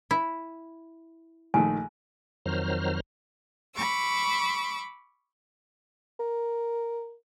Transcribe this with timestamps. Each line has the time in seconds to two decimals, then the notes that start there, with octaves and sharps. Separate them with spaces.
0.11 E4
1.54 A#1 D#3 A3 G#5
2.46 F2 D#3 F#3 C5 A#5 F6
3.75 B5 C#6 D6 E6
6.20 A#4